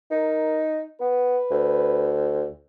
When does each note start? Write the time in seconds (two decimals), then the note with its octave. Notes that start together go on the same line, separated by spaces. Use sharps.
0.11 D#4 A#4
1.01 B3 B4
1.51 D2